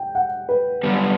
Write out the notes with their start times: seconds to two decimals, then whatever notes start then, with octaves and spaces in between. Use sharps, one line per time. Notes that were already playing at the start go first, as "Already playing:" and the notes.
Already playing: G5
0.15 F#5
0.49 B4
0.83 F#2 D3 G3 B3